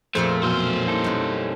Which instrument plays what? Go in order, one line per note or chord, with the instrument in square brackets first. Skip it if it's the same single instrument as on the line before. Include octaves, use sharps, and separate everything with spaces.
[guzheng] F2 A#2 A#4 [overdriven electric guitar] A3 [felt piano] G#4 [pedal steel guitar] C5
[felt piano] B2 F#3 [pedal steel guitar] A3 E6 F6 [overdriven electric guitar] C#4 C5
[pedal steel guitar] G3 D#4 A4 [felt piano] A#3 E4
[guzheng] F#2 B2